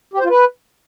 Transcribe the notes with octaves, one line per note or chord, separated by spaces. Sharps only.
G4
C5
F4
B4